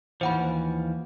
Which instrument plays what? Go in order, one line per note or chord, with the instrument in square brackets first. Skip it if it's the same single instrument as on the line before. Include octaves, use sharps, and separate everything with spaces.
[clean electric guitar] D#2 E3 F3 [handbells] C5 F#5 B5